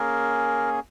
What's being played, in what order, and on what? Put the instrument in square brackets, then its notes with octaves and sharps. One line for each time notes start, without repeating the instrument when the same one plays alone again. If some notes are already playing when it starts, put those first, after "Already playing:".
Already playing: [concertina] A#3 C#4 G#4 A#4